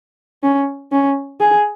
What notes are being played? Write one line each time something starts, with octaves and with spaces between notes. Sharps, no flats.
C#4
C#4
G#4